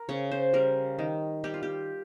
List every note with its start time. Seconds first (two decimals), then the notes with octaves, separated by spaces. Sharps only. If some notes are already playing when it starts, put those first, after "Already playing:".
Already playing: A#4
0.09 C#3 C#5
0.31 C5
0.53 G3 A#4
0.99 D#3
1.44 G3 G4
1.54 F4
1.63 G4